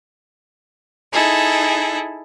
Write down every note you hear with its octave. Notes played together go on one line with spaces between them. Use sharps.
D#4 E4 G#4 A4